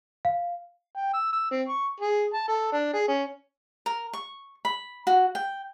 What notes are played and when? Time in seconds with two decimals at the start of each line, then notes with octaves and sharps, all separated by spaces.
0.25 F5
0.95 G5
1.14 E6
1.33 E6
1.51 C4
1.69 C#6
2.01 G#4
2.34 A5
2.48 A4
2.72 D4
2.93 G#4
3.08 C#4
3.86 A#4
4.13 C#6
4.65 B5
5.07 F#4
5.35 G5